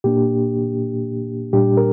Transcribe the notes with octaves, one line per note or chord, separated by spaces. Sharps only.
A#2 A#3 D4 G4
A#2 G3 D4 G4
A#4